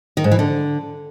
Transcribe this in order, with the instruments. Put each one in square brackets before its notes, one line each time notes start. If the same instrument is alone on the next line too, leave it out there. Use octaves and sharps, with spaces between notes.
[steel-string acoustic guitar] D#3
G#2
E3
D3